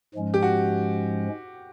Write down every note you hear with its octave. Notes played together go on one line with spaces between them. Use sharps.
G#2 F3 G#3 C#4
G4
F#4